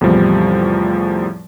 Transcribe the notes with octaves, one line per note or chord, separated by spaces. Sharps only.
E2 A2 C3 F3 G3